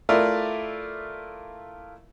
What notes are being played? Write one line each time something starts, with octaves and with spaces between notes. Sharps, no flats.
A3 E4 F4 A#4 D5